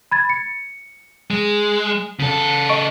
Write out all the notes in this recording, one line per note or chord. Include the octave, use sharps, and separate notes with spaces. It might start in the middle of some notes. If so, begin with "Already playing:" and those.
B5 G#6 A6
C#7
G#3
C#3 A4
D#5 C#6 D7